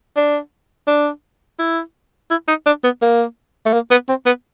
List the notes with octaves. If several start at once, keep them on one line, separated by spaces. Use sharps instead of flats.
D4
D4
E4
E4
D#4
D4
B3
A#3
A3
A#3
B3
C4
B3